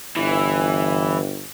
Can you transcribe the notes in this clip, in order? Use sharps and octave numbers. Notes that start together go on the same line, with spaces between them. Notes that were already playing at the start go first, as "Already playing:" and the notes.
G1 E3